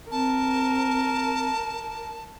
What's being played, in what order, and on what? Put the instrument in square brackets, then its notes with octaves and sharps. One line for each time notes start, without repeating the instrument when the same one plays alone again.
[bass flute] C4 [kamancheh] A#4 [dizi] A5